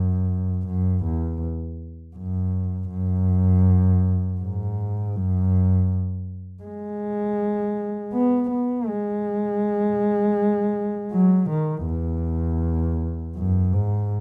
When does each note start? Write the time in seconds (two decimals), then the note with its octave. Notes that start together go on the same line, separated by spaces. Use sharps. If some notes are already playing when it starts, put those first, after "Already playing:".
Already playing: F#2
0.67 F#2
1.04 E2
2.16 F#2
2.90 F#2
4.40 G#2
5.15 F#2
6.63 G#3
8.13 B3
8.50 B3
8.88 G#3
11.12 F#3
11.49 D#3
11.86 E2
13.36 F#2
13.73 G#2